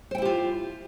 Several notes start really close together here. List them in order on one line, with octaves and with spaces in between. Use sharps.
C5 G5 E4 G4 F4